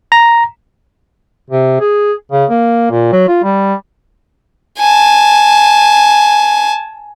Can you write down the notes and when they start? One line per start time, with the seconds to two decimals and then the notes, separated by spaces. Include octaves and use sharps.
0.12 A#5
1.50 C3
1.80 G#4
2.32 C#3
2.50 A#3
2.91 A#2
3.12 F#3
3.28 F4
3.43 G3
4.79 G#5 A5